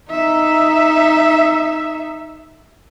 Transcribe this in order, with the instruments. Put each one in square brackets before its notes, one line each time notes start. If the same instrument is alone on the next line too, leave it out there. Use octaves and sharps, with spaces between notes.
[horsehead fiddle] D#4 E5